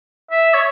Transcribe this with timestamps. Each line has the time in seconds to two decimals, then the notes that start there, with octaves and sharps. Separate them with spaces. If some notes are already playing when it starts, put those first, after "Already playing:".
0.31 E5
0.54 C#5